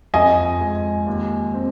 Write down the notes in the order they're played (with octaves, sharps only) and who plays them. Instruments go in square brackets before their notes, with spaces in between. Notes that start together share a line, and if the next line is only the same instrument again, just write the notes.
[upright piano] F2 [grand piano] D#5 G#5
[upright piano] G#3
D#2
C4